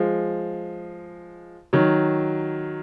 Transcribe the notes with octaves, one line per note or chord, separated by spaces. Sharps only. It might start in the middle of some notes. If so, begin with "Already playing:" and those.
Already playing: F3 G#3
D#3 F#3